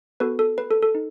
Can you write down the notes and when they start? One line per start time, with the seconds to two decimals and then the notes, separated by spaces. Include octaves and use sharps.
0.20 B3 F#4 A4 B4
0.39 A4
0.58 B4
0.71 A4
0.82 A4
0.95 D#4